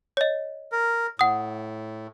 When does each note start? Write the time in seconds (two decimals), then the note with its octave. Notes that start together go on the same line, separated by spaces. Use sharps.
0.17 C#5 D#5
0.72 A#4
1.19 A2 F#5 D#6